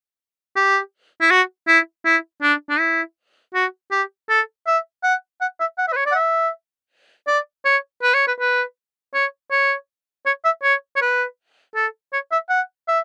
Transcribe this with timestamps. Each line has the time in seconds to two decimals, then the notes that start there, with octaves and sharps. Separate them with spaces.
0.56 G4
1.21 E4
1.30 F#4
1.68 E4
2.05 E4
2.42 D4
2.70 D4
2.79 E4
3.54 F#4
3.91 G4
4.29 A4
4.67 E5
5.03 F#5
5.41 F#5
5.60 E5
5.78 F#5
5.88 E5
5.93 B4
5.96 C#5
6.06 D5
6.12 F#5
6.15 E5
7.27 D5
7.65 C#5
8.03 B4
8.14 C#5
8.27 B4
8.40 B4
9.14 C#5
9.51 C#5
10.26 C#5
10.45 E5
10.63 C#5
10.96 C#5
11.01 B4
11.75 A4
12.13 C#5
12.32 E5
12.49 F#5
12.88 E5